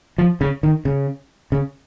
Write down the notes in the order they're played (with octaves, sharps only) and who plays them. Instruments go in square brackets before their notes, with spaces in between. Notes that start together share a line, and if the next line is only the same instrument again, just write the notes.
[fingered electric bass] F3
C#3
D#3
C#3
C#3